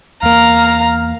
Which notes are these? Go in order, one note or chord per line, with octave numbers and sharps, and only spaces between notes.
E2 A#3 F5 A#5